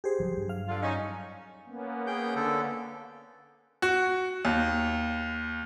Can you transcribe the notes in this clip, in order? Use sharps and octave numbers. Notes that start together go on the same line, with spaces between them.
G4 G#4 C5
F3 F#3
G2 F#3
F5
D3 F4
C#4 D#4
A#3 B3 C#4
G#4 G5 G6
D3 A4
F#4
D#2